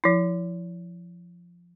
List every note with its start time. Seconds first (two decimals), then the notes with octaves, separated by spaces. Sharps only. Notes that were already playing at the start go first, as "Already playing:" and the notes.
0.04 F3 E4